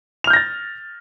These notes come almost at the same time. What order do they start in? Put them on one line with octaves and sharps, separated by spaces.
F7 F6 G6 A#6 A6